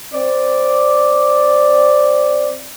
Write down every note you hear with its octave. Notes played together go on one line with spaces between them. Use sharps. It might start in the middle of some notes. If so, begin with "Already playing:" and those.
C4 D5